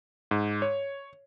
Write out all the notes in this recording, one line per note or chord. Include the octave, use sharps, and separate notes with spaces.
G#2
C#5